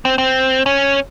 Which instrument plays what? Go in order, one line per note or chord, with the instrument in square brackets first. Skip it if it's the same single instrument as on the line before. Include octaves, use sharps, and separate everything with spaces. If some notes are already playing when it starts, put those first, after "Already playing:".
[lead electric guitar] C4
C4
C#4